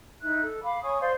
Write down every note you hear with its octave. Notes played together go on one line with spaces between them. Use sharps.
D#4 E4 E5 F#6
A4
F5 B5 D6
C#5 G#5 C#6 D#6
C5 D5 F5 C6